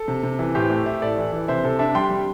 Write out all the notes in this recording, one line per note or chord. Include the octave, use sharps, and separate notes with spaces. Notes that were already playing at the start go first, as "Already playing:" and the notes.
Already playing: A4
C3
C3
E3
A2 G4 C5
A3
E4
A2 A4 D5
E3
E3
C3 C5 E5
C3 A4
D4 E5 A5
G3 G5 C6
G3